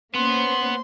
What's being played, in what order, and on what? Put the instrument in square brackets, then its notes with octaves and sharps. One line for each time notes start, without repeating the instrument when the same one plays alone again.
[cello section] A#3 C#4 C5 [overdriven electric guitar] B3 [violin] C6